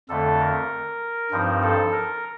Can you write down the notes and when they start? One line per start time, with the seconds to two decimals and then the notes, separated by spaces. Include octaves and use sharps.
0.09 F2 D3 A3 A4
0.41 A#4
1.31 G2 F3 C4 D#4
1.63 A4
1.92 A#4